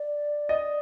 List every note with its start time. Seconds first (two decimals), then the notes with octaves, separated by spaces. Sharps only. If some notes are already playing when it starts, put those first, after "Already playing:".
Already playing: D5
0.49 D#5